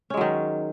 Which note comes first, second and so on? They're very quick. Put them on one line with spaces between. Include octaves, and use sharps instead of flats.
C#4 G#3 F#3 D#3